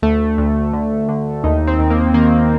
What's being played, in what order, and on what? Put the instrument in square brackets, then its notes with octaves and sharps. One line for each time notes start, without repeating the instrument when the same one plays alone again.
[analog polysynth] D2 A3
D2
D3
D3
D#2 D#4
C4
D#2
A#3
D#3 A#3